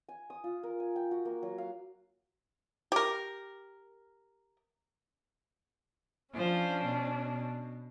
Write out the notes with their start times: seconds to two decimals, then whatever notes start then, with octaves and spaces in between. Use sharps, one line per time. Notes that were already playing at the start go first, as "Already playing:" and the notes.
0.09 G#5
0.30 D#6
0.44 F4
0.63 A#4
0.80 G#5
0.96 G5
1.11 F#4
1.25 A#3
1.43 F#3
1.58 F5
2.92 G4 A#4
6.34 F3 C#4 D4 C5
6.86 B2